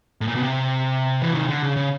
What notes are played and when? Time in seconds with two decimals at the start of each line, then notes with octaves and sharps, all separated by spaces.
0.21 A2
0.27 A#2
0.35 B2
0.43 C3
1.22 E3
1.34 D#3
1.48 D3
1.63 C#3
1.77 C#3